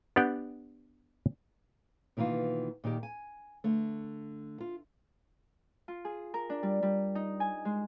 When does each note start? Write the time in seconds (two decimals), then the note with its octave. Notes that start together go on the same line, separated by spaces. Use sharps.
0.16 B3 D4 G4 F#5 G5
2.17 B2 D#3 E3 A#3 F4
2.84 A#2 D#3 D#4 G4
3.03 G#5
3.64 D3 A3
4.61 F4
5.88 F4
6.05 G#4
6.34 A#4
6.50 D4
6.63 G3
6.82 G3
7.15 D#4
7.40 G#5
7.65 G#3